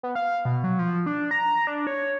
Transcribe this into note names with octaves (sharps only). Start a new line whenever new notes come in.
B3
F5
B2
F#3
F3
D4
A#5
D4
C#5